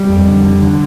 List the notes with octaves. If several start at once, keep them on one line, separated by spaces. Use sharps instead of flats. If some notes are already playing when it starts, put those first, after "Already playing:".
Already playing: G3
F2
D3
D3
D3